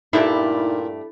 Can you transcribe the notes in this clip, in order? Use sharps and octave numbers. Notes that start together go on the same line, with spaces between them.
G2 A#2 A3 D#4 E4 G4